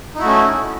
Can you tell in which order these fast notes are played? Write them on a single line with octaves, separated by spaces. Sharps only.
D#4 E4 F#4 A3 C#4